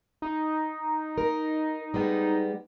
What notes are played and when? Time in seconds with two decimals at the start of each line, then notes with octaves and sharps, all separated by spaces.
0.22 D#4
1.18 A#4
1.94 G3 G#3 B3